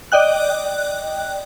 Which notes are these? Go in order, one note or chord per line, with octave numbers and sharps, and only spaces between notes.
D5 D#5 G5 F#6